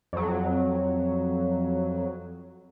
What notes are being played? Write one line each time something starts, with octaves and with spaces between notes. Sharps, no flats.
F2 F#3